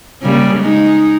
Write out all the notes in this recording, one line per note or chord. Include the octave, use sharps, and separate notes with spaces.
C#3 G3 A#3
G#3 D#4